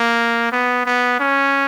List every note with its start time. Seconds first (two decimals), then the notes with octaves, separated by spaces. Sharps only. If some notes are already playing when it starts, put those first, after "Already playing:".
Already playing: A#3
0.52 B3
0.86 B3
1.20 C#4